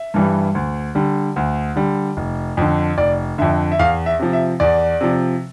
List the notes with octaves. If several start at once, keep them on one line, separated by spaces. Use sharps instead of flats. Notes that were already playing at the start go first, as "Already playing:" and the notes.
Already playing: E5
G2 E3 G3
D2
D3 G3
D2
D3 G3
F1
F2 D3
F1 D5
F2 D3 E5
E5
E2 F5
E5
C3 F3
E5
E2 D5
C3 F3